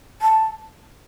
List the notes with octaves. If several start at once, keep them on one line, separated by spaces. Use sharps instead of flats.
A5